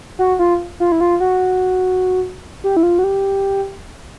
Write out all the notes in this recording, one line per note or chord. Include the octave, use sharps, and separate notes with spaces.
F#4
F4
F4
E4
F4
F#4
G4
E4
F4
F#4
G4